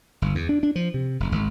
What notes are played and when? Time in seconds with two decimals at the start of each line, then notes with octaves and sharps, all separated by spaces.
0.22 G1
0.35 E2
0.49 D4
0.63 D4
0.76 F3
0.94 C3
1.20 F1
1.32 G#1